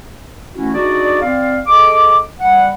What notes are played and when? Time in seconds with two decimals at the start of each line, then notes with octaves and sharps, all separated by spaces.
0.54 E3 A3 C#4 E4 F#4
0.74 D4 D#4 F#4 G#4 D5
1.21 C4 D5 F5
1.67 G#4 A4 D#5 D6
2.39 G3 F#5